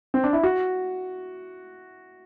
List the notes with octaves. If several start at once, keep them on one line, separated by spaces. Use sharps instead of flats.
C4
D4
E4
F#4